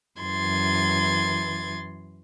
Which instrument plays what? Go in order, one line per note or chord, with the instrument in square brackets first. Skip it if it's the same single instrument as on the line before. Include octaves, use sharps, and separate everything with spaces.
[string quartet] F#2 E3 C6 G#6 A6